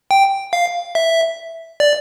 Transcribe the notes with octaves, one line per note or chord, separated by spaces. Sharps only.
G5
F5
E5
D5